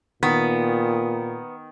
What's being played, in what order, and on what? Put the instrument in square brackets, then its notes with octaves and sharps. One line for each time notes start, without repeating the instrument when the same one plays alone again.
[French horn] A#2 [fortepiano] D#3 [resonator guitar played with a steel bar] B3